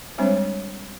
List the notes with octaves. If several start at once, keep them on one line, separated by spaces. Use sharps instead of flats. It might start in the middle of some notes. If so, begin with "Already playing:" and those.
G3 G#3 C4 D4 C5 C#5